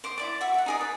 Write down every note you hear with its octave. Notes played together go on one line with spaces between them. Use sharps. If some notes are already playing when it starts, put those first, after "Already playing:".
C5 D6
E4 D5 D6
F#4 E5
E5 F#5
D#4 G#4 D5
B4